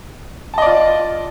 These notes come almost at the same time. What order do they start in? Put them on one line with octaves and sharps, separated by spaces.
A5 D#5 D5 F4